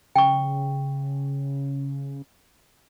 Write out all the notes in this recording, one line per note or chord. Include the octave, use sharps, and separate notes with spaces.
C#3 G5 C#6